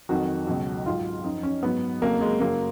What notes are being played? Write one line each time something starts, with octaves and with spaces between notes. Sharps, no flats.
F2 D#3 F#3 F#4
C#2 B2 F#3
G#2 F#3 F4
F#2 F3 D#4
C#4
G#2 F#3 B3
F2 C#3 F#3 A#3
G#3
F#2 C#3 F#3 A#3